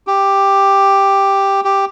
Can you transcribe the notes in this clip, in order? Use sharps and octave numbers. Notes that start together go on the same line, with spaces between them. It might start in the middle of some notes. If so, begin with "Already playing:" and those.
G4
G4